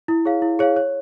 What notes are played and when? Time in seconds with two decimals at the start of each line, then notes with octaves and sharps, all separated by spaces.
0.08 E4
0.25 G#4 C#5 F5
0.42 E4
0.59 G#4 C#5 F5
0.76 C#5